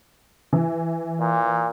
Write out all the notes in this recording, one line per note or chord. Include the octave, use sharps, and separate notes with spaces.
E3
A#2